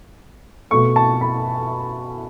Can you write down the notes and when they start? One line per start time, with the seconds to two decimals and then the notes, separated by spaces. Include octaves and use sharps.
0.71 B2 A3 C#6
0.96 A5
1.21 B5